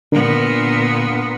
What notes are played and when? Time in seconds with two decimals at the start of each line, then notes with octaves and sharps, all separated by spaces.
0.12 A#2 D3 B3 D4 A#4